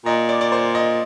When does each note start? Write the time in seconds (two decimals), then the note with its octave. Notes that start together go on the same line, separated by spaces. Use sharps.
0.05 A#2 D#5
0.29 D5
0.41 D5
0.52 C5
0.75 D#5